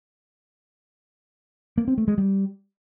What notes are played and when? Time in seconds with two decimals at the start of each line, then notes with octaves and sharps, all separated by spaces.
1.78 A#3
1.88 C4
1.98 A3
2.08 G#3
2.18 G3